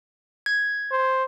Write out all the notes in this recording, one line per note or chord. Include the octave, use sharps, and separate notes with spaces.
G#6
C5